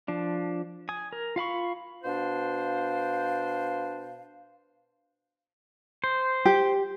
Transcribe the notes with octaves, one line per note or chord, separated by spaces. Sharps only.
F3 D4
G#5 D#6
A#4
F4 F5 B5 C#6
B2 D4 C5 F5
C5
G4